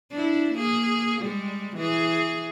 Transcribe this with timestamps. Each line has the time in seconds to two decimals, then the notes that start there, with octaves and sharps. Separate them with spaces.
0.12 D4 E4
0.54 A#3 G#4
1.21 G3 G#3
1.76 E3 G#4